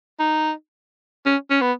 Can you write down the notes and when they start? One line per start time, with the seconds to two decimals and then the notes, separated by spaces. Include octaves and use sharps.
0.19 D#4
1.26 C#4
1.50 C#4
1.61 B3